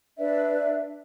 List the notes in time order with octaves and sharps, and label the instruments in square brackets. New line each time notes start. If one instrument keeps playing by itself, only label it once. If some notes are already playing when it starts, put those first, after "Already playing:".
[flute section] D4 B4 D5 E5